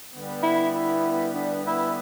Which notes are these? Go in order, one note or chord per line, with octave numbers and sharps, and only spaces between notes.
D3 G3 B3
E4
E4
D4
E4